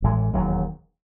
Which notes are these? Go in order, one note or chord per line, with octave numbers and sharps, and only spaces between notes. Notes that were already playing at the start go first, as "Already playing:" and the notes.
A1 A2 E3 G#3
E1 D#2 D#3 F#3